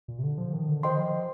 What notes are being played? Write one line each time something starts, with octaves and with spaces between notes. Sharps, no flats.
A#2
C3
D3
F3
D#3
D3
D#3 C5 D#5 G5 C6
F3